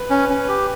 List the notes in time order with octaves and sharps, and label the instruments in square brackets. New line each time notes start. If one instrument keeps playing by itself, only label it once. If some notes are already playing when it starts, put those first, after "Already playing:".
Already playing: [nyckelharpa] B4
[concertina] C#4
C#4
G4